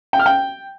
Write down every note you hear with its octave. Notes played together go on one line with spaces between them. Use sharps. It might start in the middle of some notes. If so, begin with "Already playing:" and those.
G5
F6
G5